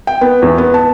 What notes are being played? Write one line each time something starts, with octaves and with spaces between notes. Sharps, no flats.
G5
B3
E2
B3
A5